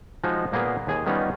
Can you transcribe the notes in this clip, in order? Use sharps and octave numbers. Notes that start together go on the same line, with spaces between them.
F3 G#3 D#4 F#4
A#2 A#3 B3 G#4
D#2 G#4 G#5
D#3 G3 B3 C#4 D#4 F4